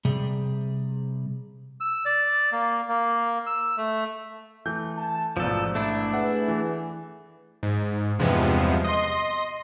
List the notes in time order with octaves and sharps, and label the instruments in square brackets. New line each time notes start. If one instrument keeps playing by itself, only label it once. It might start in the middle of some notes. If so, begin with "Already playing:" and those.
[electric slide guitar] C3 G3 G#4
[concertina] E6
D5
A#3
A#3
E6
A3
[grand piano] E3 A3 G6
[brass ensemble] A5
[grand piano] A1 G#2 B2 [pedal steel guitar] F3 A4 [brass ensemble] D5
[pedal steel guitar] A3 D4 E4
[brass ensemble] G#4 B4 [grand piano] F#5
[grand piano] E3
[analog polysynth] G#2
E2 G2 C3 F3 G#3 B3
D#5 C6